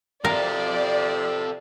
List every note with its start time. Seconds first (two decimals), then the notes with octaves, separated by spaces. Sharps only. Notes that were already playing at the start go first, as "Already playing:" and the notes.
0.25 C3 F3 A4 A#4 D5 F5